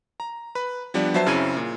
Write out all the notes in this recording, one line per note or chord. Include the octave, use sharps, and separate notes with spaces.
A#5
B4 B5
F3 G3 B3 D4 B4 D5
F#3 B4 C5 E5 A5 C7
F#2 C#3 C4 E4 G#6 D#7
A#2